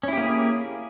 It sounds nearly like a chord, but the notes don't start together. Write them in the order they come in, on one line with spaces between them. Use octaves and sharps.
C#4 E4 G4 A#3 G#4